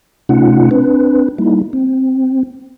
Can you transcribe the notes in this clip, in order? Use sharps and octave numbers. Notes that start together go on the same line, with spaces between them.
C3 A3 C#4 D#4 F4 F#5
C4 D4 B4
G3 A#3 D#4 E4
C4